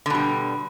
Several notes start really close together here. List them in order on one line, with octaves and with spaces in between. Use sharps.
D3 B2 G3